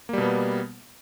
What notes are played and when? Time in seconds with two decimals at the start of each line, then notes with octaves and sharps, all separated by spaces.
0.09 A#3
0.13 G3
0.18 B2
0.22 B3